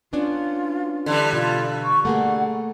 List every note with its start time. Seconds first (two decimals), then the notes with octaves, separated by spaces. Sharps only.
0.13 B3 C#4 D4 F4
1.06 D3 E3 G3
1.33 B2 F4
1.84 C#6
2.05 A3 A#3 G#4 F#5